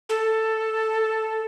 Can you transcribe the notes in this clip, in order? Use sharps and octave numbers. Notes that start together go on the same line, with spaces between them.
A4